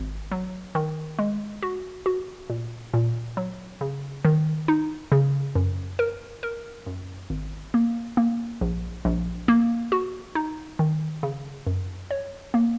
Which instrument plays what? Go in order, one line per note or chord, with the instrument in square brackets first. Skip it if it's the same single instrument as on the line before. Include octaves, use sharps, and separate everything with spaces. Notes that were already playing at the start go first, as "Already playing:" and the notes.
Already playing: [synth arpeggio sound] G#1
F#3
D#3
G#3
F#4
F#4
A#2
A#2
F#3
C#3
D#3
D#4
C#3
F#2
A#4
A#4
F#2
G#1
A#3
A#3
A#1
A#1
A#3
F#4
D#4
D#3
C#3
F#2
C#5
A#3